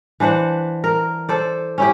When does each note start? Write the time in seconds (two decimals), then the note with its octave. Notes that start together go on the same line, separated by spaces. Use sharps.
0.20 E3 D4 C5 F#5
0.84 A#4
1.29 A4 C5 D5
1.78 C#4 E4 G4